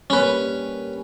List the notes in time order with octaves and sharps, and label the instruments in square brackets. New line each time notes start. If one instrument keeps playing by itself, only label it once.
[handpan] G3 A#3 [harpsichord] C#4 B4